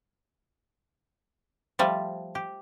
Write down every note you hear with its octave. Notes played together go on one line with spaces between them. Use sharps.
F3 G3 A3
G4